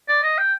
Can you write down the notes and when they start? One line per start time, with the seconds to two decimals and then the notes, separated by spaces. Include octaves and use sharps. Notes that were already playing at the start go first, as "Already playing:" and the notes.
0.08 D5
0.23 D#5
0.38 G5